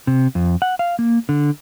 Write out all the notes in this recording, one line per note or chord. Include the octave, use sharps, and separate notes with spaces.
C3
F2
F#5
F5
A#3
D3